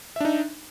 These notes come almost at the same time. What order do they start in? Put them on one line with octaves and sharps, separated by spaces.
E5 D4 D#4